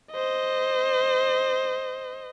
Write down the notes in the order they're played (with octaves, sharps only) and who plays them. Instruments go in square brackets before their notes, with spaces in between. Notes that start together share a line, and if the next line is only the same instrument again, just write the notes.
[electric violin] C5 D#5